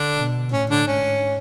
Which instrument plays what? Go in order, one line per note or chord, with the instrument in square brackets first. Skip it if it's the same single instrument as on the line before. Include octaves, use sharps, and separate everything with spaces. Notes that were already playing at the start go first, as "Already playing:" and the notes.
Already playing: [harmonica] D3 D4
[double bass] B2
[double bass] A2 [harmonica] C#4
[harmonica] D3 D4
[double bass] G#2 [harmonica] C#4